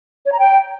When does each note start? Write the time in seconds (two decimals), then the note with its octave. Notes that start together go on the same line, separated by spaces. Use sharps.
0.25 C#5
0.32 A#5
0.38 G5